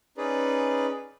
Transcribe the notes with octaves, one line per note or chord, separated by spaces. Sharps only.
C#4 D#4 G#4 B4 D5